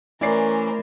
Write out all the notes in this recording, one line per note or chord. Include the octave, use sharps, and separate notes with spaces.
E3 A3 C#4 E4 A#4 C5 D5 C7